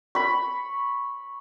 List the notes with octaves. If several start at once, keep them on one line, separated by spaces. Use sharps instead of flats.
B5 C#6